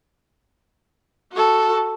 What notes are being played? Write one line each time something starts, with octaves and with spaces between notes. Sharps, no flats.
F#4 A4